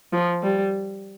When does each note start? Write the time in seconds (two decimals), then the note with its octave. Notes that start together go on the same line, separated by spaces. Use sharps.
0.13 F3
0.43 G3